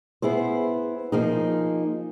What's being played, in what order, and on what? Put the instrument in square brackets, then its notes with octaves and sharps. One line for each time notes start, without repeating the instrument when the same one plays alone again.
[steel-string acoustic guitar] B3 E4 G#4 C5
F3 A#3 D#4 G#4